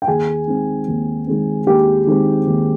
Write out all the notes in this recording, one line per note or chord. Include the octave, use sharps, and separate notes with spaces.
G5
D#2 G#4 G#5
D#3 G#3 C4
D#2
D#3 G#3 C4
D#2 G4 G5
D#3 G#3 C4
D#2